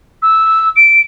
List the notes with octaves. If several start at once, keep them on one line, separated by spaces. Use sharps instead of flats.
E6
D7